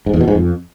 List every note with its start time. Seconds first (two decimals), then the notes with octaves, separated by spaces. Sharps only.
0.06 G#2
0.13 E2
0.21 B2
0.28 G#2
0.35 F2